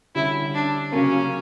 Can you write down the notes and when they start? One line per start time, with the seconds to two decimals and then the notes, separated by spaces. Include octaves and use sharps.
0.15 D3 G3 C#4 E4
0.54 D4
0.92 C#3 F#3 A#3 C#4